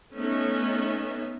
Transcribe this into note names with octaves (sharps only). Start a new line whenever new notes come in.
A3 B3 C#4 D#4 E5